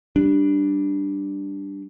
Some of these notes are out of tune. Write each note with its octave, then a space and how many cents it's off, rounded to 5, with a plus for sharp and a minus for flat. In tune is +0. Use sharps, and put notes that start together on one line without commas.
G3 +0 D4 +0